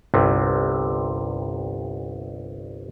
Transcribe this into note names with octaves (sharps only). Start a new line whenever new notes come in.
G1 C2 C3